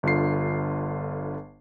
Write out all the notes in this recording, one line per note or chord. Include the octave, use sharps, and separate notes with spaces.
G1 D3 F4 C7